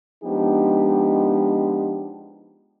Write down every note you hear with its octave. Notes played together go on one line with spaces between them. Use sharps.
F3 G#3 B3 D4 D#4 G4